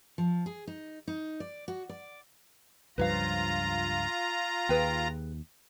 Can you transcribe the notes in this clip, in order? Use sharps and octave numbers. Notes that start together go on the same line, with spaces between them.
F3
G#4
D#4
D#4
D5
F#4
D5
C#2 G2 F3 F4 B4 C#5 F5 A#5
D#2 G#4 B4 G5